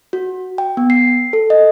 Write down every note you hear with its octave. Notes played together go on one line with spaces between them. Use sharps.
F#4
G5
B3
C7
A4
D#5